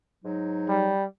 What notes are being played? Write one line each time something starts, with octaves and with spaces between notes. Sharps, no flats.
G#2 F#3 D#4
G3